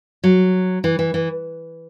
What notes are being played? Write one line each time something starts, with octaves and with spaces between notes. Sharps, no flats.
F#3
E3
E3
E3